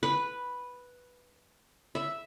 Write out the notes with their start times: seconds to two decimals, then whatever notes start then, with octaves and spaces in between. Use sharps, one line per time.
0.03 B4
1.95 E5